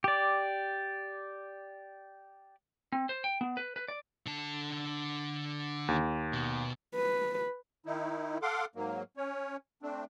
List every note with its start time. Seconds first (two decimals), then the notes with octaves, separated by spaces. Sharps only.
0.04 G4 D5
2.92 C4
3.09 C5
3.24 G5
3.41 B3
3.57 B4
3.76 B4
3.88 D5
4.26 D3 A5
5.88 D#2
6.33 B2
6.95 B4
7.86 D#3 D#4 E4
8.42 A4 F5 F#5 C6 D6
8.76 G#2 F#3 A#3
9.17 C#4 C#5
9.82 A3 C4 D4